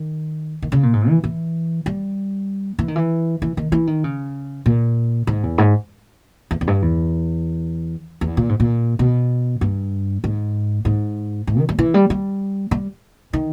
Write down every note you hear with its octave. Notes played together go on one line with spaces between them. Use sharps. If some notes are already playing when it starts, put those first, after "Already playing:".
Already playing: D#3
D#3
C#3
A#2
G#2
E3
E3
G3
E3
D#3
E3
E3
D#3
E3
D#3
C#3
A#2
G#2
E2
G#2
E2
E2
G2
E2
E2
A#2
G#2
A#2
B2
G2
G#2
G#2
G#2
D#3
G3
E3
G3
G3
G3
D#3